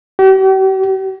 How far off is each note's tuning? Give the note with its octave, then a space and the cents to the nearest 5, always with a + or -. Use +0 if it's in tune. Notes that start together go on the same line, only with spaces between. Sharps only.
G4 -45